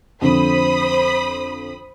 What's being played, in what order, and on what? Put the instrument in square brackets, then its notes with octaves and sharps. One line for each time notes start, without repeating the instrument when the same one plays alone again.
[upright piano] F2 D3 [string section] C5 B5 D#6